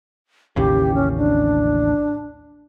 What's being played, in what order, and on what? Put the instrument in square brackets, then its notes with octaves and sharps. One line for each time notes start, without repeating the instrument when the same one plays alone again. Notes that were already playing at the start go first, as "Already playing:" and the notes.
[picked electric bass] A1 D#2 C#3 [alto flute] G4
[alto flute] C#4
D4